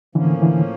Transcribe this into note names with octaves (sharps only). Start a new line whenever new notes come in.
A2 D3 E3 F3 A#3 C#4
D3 E3